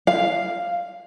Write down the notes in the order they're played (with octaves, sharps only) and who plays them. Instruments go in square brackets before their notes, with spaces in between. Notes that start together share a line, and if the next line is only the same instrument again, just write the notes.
[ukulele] F5